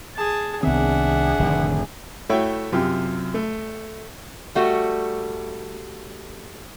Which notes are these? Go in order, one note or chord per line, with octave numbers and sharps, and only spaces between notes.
G#4 A5
C2 D#3 B3 C4 D4 G#4 E5 F#5
F1 A2 D3 D#3
A3 E4 F#4 C#5 E5 G5
F#2 C3 F#3 F4 G4
A3
G3 A3 F#4